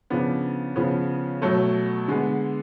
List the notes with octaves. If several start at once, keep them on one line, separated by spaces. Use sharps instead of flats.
C#3 F3 B3 D4
C#3 F3 B3
B2 F#3 A3
D3 G#3 B3